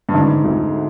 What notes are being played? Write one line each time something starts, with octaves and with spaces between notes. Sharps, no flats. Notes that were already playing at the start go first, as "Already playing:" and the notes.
G2
G#2 D3
D2